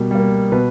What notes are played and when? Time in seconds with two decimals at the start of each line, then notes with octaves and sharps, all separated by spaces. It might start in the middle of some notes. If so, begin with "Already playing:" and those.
Already playing: B2 G3 A#3
0.11 G3 A#3
0.52 B2 B4